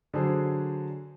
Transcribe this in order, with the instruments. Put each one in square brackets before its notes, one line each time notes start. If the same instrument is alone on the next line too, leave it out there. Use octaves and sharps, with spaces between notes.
[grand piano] D3 F#3 D4 G#4 C5